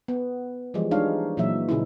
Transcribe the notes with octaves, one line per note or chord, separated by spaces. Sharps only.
B3
E3 F3 G3 G#3
G3 G#3 D4 D#4 C#5 F5
A#2 E3 F#3 E5
A#2 C#3 C#4 D#4 E4